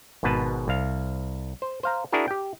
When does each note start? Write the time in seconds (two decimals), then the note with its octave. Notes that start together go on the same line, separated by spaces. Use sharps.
0.23 G#1 G#2 B2 B4 A5
0.68 C2 F5
1.62 C5
1.83 C5 F5 A#5
2.12 D4 E4 F#4 G#4 A#4
2.28 G4 G5